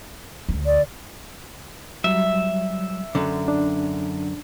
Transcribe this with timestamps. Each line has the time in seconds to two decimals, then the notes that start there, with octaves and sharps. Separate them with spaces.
0.49 D2
0.66 D5
2.04 F#3 G3 E5
3.15 F#2 D3
3.48 D4